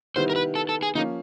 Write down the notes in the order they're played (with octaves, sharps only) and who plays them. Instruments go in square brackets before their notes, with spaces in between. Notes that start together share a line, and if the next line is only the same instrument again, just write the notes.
[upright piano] C3 D#3 G3 B3 E4 [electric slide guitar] C5
[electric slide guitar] A#4
B4
A4
A4
G#4
[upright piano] F3 A#3 C#4 [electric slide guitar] D#4